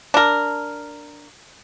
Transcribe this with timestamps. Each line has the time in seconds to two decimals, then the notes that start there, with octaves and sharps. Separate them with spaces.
0.14 D4 A#4